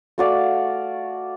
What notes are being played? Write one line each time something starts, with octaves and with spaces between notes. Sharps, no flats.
A3 F#4 D5 F5